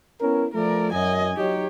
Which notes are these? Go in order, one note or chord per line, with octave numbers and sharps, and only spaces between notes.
B3 C#4 E4 A#4
F3 A3 A#4 D5
F#2 D#5 G#5
F#3 D#4 G4 C#5